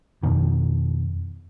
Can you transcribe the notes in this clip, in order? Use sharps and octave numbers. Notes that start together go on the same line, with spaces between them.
F2 B2 D#3